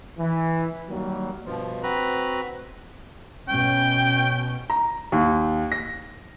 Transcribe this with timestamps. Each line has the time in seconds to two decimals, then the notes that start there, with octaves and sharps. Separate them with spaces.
0.18 E3
0.88 D#3 F#3 G3 A#3
1.46 G2 B2 F3
1.83 C4 F#4 B4 A#5 B5
3.49 B2 C#4 G5
4.70 A#5
5.12 D#2
5.72 A#6